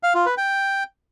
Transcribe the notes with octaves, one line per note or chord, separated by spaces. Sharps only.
F5
F4
B4
G5